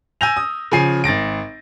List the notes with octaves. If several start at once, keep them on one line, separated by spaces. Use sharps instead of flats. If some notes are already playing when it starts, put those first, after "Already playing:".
G#5 E6 G6 A#6 F7
D#6
C#3 F3 G#5 C7
G#1 A6 A#6 D7